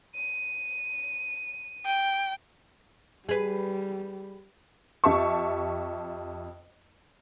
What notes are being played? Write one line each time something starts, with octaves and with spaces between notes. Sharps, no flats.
D#7
G5
G3 G#4 B4
F2 G4 E5 A5 C#6